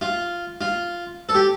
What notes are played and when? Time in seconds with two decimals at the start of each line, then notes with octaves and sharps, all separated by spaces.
0.01 F4
0.61 F4
1.29 A4
1.35 G4